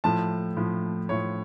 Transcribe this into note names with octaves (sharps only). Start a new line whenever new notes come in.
A2 F3 A5
A2 F3
A2 F3 C#5